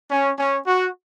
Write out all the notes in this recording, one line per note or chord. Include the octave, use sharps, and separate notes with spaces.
C#4
C#4
F#4